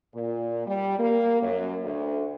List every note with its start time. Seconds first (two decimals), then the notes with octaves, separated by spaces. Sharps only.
0.14 A#2
0.67 G3
0.98 A#3
1.42 F#2
1.83 D2